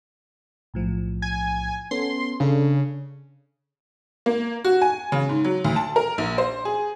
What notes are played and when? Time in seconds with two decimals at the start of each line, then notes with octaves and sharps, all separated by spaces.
0.74 B1 A2 F3
1.22 G#5
1.91 B3 C#4 A4 C6
2.40 C#3 D4 A4
4.26 A#3
4.65 F#4
4.82 G#5
5.12 C#3
5.29 G#2
5.44 F#3
5.65 D2
5.76 A5
5.96 A#4
6.18 A#1
6.38 C5
6.65 G#4